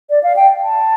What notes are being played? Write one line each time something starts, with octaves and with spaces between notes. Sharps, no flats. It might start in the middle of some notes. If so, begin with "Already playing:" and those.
D5
F5
G5
A5